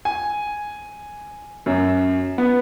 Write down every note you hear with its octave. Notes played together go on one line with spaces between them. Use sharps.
G#5
F#2
B3